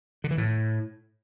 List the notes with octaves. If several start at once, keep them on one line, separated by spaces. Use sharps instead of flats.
D3
E3
A2